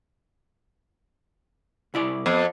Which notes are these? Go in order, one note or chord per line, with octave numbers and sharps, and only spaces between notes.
C2 E4 D5
F2 B3